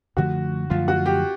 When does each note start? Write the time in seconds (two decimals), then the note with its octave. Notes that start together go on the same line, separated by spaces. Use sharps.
0.17 F#2 D3 F3 A3 F#4
0.70 F#2 D3 F3 A3 F4
0.88 F#4
1.06 G4